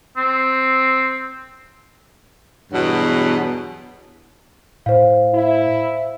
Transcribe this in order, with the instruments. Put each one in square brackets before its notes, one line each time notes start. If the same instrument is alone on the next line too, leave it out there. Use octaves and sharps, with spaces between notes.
[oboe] C4
[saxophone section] E2 G2 B2 F#3
[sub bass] A2 [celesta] C5 F5
[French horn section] E4